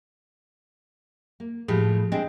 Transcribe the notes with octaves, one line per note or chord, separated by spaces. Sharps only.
A#3
A2 F3 G4 G#4
C4 D4 G#4 D#5 G5